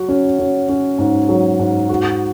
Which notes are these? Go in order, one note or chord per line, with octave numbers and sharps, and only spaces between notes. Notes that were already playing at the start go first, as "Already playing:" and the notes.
Already playing: F#3 F#4
C#4
C#4
C#4
G#2
F#3
G#2
F#4